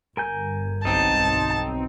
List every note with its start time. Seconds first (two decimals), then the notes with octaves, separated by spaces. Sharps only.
0.17 G1 A#4 G#5 G6
0.85 B1 C4 D#4 A5